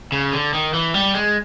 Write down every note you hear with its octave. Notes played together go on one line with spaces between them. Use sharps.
C#3
D3
D#3
E3
G3
G#3